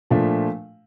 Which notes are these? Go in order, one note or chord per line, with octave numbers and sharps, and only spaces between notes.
A#2 F3 A3 D4